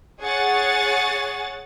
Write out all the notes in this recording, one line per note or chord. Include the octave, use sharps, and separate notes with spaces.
G#4 C#5 F#5 A6